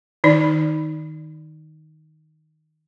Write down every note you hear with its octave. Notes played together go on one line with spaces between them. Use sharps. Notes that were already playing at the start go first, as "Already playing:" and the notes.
D#3 D#4 D5